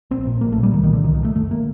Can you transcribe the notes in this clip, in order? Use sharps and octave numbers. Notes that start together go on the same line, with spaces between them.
A#1 C4
A#2
A#1 A#3
A3
A#2
G3
C2 D#3
D#3
A#2 D3
C2 D#3
D#3
A#2 A3
F#1 A3
D3 A#3